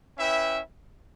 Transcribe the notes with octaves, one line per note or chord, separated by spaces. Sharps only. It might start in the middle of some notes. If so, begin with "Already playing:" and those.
C#4 E4 B4 E5 G5